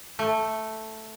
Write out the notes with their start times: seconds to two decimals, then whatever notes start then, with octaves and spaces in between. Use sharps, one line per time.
0.19 A3